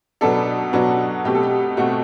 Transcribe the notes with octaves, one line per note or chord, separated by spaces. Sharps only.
B2 F#3 B3 D4 A4
B2 F#3 B3 D4 F#4
B2 A3 C4 G4
A4
G4
B2 A3 C4 F#4